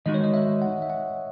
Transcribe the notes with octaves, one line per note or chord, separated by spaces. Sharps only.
D#3 G#3 D#4 F#4 D#5
C#5
D#5
E5
F#5
E5
F#5